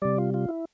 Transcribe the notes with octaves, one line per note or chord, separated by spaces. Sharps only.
C3 G3 D5
F4
F4
E4